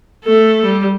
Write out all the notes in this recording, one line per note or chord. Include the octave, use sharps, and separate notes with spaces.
A3 A4
G3